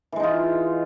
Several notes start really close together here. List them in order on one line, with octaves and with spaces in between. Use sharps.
E3 G#3 D#4 F4